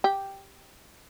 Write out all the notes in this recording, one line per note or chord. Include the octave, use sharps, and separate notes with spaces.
G4